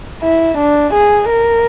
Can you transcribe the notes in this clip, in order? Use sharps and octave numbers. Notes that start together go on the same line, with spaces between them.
E4
D4
G#4
A#4